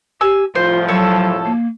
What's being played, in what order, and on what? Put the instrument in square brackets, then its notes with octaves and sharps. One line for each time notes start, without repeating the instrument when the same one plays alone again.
[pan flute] G4 [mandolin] G#5 E6
[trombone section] C2 A2 F3 [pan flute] F4 [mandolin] C5
[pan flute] F#3 [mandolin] A4 C#5
[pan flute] A#3